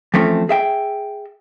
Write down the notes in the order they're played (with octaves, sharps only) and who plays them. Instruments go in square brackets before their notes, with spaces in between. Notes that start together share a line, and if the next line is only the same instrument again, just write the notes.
[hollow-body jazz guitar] E3 F3 A3 C4 C#4
G#4 E5 G5